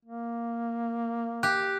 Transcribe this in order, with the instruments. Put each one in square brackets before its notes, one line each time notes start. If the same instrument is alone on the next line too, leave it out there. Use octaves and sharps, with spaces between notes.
[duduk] A#3
[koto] G4 [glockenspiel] F#6